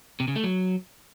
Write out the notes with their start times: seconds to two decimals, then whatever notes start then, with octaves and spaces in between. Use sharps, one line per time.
0.20 C3
0.28 C#3
0.36 A3
0.44 F#3